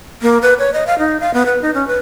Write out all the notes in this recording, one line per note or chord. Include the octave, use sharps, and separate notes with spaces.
A#3
B4
C#5
D#5
F5
D#4
F5
B3
B4
D#4
C#4
B4